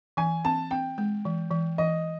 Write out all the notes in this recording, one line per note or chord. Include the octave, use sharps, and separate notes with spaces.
E3 G#5
C4 A5
C4 G5
G#3
E3
E3
E3 D#5